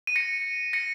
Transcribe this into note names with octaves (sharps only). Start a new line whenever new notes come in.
D#7
A#6 C#7
A#6 C#7